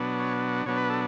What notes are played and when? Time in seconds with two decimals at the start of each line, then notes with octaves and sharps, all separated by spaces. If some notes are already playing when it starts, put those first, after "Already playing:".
Already playing: B2 F#3 B3 D4
0.20 C#5
0.66 B2 F#3 B3 D4 C#5
0.77 B4
0.90 A4